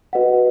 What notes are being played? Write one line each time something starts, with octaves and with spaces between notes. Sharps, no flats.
F#4 B4 D#5 F#5